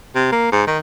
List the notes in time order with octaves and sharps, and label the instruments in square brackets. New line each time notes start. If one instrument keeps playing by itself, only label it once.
[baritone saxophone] C3
A#3
G#2
D#3